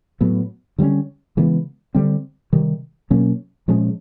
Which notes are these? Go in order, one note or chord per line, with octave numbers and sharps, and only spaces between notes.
A2 F#3 B3
D3 G3 A#3 C#4
C#3 E3 G#3 B3
D3 G3 C4
C3 D#3 G3
B2 F#3 A#3 C#4
A#2 F3 G#3 C#4